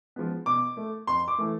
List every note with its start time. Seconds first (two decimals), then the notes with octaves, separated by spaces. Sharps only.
0.16 F3 G#3 B3
0.46 B2 D6
0.77 A3
1.07 F2 C6
1.28 D6
1.38 E3 A3